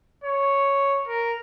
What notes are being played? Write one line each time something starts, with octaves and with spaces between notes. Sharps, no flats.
C#5
A#4